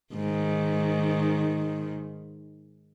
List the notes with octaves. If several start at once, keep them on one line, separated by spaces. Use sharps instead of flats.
G#2 D#3